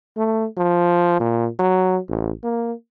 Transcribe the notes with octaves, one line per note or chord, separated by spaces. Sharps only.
A3
F3
A#2
F#3
A1
A#3